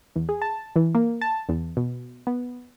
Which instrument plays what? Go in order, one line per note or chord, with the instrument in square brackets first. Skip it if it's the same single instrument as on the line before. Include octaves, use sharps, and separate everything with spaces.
[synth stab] E2
G#4
A5
E3
A#3
A5
E2
B2
B3